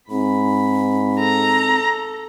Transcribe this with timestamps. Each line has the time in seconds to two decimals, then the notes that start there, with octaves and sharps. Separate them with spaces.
0.11 G#2 C4 B5
1.19 A4 A#5